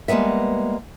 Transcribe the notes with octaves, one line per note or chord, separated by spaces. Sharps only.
G3 G#3 A#3 B3 E5